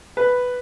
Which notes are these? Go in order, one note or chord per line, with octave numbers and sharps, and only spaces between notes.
B4